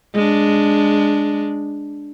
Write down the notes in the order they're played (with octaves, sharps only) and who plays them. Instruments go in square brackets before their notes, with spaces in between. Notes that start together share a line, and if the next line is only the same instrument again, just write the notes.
[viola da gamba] G#3 D4